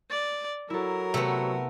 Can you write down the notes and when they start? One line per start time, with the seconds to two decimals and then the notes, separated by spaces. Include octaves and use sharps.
0.11 D5 A6
0.70 F#3 E4 A4 A#4
1.14 C3 A3 B3